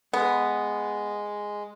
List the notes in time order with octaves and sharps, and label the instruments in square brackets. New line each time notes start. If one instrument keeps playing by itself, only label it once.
[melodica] G#3 [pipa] B3